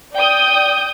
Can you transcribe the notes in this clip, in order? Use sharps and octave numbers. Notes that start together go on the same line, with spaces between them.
D5 G5 D#6 G6